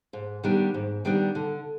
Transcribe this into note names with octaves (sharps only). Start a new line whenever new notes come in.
G#2
D#3 G3 B3 D4
G#2
D#3 G3 B3 D4
D3